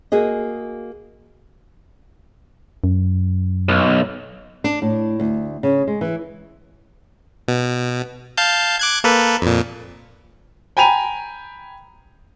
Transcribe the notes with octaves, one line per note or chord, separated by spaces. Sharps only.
A#3 F#4 G#4 D#5
F#2
B1
D4
A2
D2
C#3
G#3
E3
B2
F5 A5 G6
D6 F#6 G#6
A#3 A4 B4
F2 A#2
G5 G#5 A#5 B5 D#7 F7